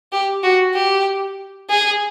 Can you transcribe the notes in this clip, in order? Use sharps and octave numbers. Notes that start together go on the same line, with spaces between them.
G4
F#4
G4
G#4